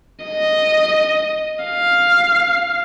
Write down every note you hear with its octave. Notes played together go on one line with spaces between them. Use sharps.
D#5
F5